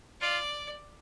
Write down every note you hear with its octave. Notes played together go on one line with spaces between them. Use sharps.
F4 D5